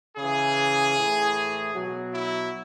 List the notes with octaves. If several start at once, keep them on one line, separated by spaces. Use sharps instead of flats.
C#3 E3 G#4
A2 E3
B2 F#3 F#4
E4